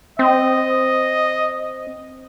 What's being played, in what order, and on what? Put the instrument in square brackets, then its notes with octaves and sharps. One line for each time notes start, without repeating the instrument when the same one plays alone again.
[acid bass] C4 [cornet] D#5